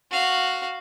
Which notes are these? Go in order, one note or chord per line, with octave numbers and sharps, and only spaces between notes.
F#4 F5